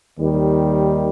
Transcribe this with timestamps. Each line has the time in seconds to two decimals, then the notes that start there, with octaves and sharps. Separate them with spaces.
0.18 D#2 D#3 G3